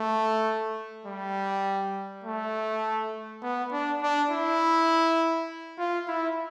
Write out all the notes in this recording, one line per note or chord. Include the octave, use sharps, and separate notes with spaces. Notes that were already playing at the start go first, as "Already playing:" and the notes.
Already playing: A3
G3
A3
B3
D4
D4
E4
F4
E4